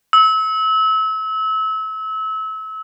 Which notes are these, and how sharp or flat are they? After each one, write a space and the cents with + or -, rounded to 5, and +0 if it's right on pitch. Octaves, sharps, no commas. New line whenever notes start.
E6 -30